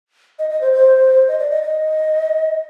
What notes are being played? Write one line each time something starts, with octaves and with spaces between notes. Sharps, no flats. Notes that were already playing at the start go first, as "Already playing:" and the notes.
D#5
D#5
C5
C5
D#5
D5
D#5
D#5